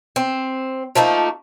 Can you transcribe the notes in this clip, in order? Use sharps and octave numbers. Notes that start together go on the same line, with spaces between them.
C4
F3 A3 A#3 D#4